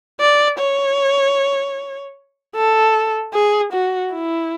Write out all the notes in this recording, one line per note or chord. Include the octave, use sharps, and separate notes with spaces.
D5
C#5
A4
G#4
F#4
E4